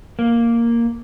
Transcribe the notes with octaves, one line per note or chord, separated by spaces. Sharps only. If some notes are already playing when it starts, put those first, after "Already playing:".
A#3